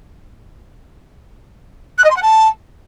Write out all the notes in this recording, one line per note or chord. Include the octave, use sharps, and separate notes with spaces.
F#6
D#5
C6
F#5
A5